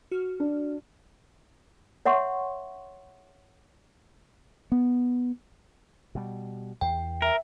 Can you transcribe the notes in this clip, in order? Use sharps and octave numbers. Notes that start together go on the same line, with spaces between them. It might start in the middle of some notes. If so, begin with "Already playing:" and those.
F#4 F6
D4
C#5 E5 F#5 C6 C#6
B3
B2 G3
E2 G5
A#4 E5